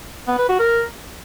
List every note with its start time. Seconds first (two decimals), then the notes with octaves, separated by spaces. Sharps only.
0.28 B3
0.38 B4
0.49 F#4
0.60 A#4